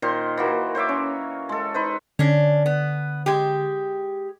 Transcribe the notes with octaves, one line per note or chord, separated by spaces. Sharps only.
A#2 D#3 C5 C6
E3 A#3 F#4
C5 C#5 E5 D6
C#4
G#3 A4
D#4 B4 C5
D3 C#4 D4
B3
G#3 G4